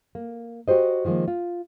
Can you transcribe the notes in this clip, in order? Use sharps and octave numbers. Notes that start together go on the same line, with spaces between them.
A#3
F#4 G4 C5 D#5
D#3 F3 G#3 A#3
F4